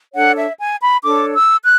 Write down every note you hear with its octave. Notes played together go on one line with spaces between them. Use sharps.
D4 A4 C#5 F#5
E5
G#5
B5
D4 A4 C#5 D6
E6
F#6